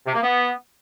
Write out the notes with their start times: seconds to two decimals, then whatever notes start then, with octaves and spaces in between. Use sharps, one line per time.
0.07 C3
0.14 A#3
0.22 B3